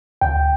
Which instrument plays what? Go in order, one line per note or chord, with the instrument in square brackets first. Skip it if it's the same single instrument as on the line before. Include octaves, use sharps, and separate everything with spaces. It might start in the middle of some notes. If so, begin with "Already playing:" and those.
[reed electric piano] D2 G5